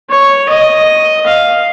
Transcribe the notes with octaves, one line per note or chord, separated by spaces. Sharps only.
C#5
D#5
F5